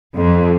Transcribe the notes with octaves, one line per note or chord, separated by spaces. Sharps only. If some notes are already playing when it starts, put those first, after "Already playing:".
F2